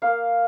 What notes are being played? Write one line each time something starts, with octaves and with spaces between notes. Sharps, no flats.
A#3 F5